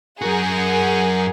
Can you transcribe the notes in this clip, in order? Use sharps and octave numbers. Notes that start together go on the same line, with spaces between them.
F#2 F#4 G#4 A#4 F#5